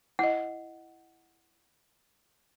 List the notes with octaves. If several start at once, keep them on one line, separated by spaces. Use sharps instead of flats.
E4 D#5 F#5